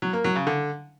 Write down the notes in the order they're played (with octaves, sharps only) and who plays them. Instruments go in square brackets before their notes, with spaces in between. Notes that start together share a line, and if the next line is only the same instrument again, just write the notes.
[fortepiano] F#3
A#3
F#3
C#3
D3